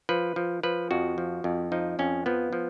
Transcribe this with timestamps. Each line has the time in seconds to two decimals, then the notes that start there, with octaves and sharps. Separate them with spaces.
0.09 F3 B4
0.36 F3
0.63 F3 B4
0.91 F2 F#4
1.18 F3
1.44 F2
1.72 F3 D#4
1.99 F2 C#4
2.26 F3 B3
2.53 F3